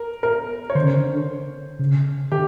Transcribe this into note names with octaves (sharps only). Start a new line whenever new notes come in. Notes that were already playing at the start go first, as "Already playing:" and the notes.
Already playing: A#4
A#4
C#5
D3 C5
C#3
D3
C#3
D3 G4